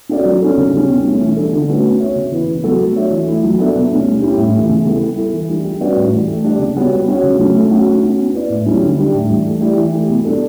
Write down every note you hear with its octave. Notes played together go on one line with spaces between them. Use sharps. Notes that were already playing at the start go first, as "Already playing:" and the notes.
C#4 F#4 A4 D5
F#3
C#4 F#4 A4
C#3
G3 C#4
B2
A3 C#4
E3
G3 D4 A4
D3
A3 C#4 F#4 B4
B3
F#4 C#5 E5
C#3
E3 B3 E4 B4
C#3
F#3 B3 F#4 A4
A3
D4 F#4 C#5 E5
E3
A3 E4
F#3
B3 D4 A4 E5
B2
A3 C#4
G3
C#4 E4 G4
A2
E3 A3
C#3
G3 B3 E4 A4
B3
E4 A4
E3
G3 D4
G3
C#4 F#4 B4 D5
A2
E3 G3
A3
D4 G4 D5
C#3
G3 B3 F#4 C#5
G3
C#4 F#4 C#5
C#3
F#3 A3 C#4
A3
C#4 F#4
A3
C#4 F#4
B3
E4 B4 D5
A2
F#3 C#4 E4 G4
D3
G3 D4 G4
A2
E3 G3 D4 G4
A3
E4 G4 D5
E3
A3 E4 G4
B2
G3 D4 A4